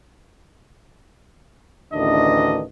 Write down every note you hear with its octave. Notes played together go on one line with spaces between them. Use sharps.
A1 D2 D#3 E3 D4 D#5